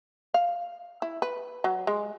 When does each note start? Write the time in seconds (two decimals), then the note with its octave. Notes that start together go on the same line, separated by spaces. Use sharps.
0.34 F5
1.02 E4
1.22 B4
1.64 F#3
1.87 G#3